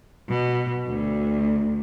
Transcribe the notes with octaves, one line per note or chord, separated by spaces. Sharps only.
B2
D2